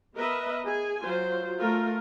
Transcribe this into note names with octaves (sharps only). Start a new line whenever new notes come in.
B3 A#4 B4 D#5 E5
G#4 G#5
F#3 F4 C5
A3 F4 A#4